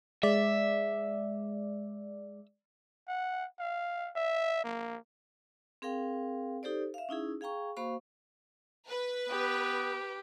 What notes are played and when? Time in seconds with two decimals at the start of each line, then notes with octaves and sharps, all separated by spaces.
0.23 G#3 D5 E5
3.08 F#5
3.60 F5
4.16 E5
4.64 A#3
5.82 C4 G#4 A#4 F5 G5
6.63 D#4 G4 A4 C5 D5
6.94 E5 F5
7.09 C#4 D#4 E4 G#4
7.41 G#4 F5 G5 A#5 C#6
7.77 A#3 F#4 C5 F5 B5 C#6
8.90 B4
9.29 B3 G4